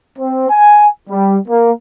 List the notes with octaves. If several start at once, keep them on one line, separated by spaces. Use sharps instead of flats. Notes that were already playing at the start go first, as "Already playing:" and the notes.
C4
G#5
G3
A#3